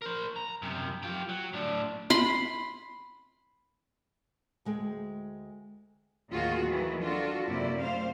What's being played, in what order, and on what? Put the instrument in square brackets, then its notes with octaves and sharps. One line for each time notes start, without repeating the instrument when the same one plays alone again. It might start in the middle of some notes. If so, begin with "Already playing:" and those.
[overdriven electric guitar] A#4 C5
A#5
F#2 C3
F4 G4
F#3
A2 D4
[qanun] B5 C6
[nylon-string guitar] D2 G#3 G#4 G5
[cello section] D#2 A2 D#3 F4 F#4 G#4
D#3 E3 F#3
D4 F4 F#4 A4
F#2 C3 A#3 E4 D5
A3 C5 F5